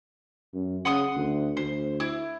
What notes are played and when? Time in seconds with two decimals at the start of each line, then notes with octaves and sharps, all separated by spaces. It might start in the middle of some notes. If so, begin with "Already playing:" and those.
0.54 F#2
0.85 C#3 F#5 C6 D#6
1.16 D2
1.57 D2 C5
2.00 E4